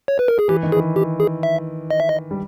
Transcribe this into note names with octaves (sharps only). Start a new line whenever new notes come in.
C#5
B4
A#4
G#4
E3 G4
D#3
G#4
E3
G4
G#4
E5
D#5
E5
D#5
G3